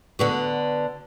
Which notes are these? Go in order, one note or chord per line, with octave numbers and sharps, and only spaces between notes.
D3 B3 F#4